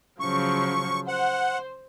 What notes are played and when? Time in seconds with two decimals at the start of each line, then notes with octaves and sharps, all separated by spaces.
0.20 C#3 F3 F#3 C#6
1.08 C5 F#5